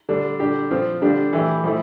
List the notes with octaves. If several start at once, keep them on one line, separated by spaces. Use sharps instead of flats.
D3 G3 D4
D3 G3 D4 G4
F3 C4 F4
D3 G3 D4 G4
E3 A3 E4 G4
F3 A3 E4